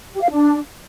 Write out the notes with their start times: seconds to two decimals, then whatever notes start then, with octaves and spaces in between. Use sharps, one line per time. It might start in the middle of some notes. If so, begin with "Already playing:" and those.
0.12 G4
0.21 F5
0.30 D4